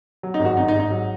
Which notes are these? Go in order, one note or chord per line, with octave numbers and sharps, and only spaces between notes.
F#3
D#4
G#1
F#4
G#1 D#4
D#4
G#2
D#4
F#3